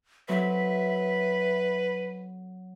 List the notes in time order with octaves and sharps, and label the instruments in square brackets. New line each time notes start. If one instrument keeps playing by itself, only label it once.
[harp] F#3 C4 A4 [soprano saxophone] B4 [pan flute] E5